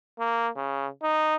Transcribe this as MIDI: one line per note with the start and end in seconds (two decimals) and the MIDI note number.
0.19 0.48 58
0.56 0.87 49
1.03 1.36 63